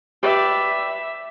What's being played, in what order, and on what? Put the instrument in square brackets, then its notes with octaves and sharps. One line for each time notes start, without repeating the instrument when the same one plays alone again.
[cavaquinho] G4 B4 D5 [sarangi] E5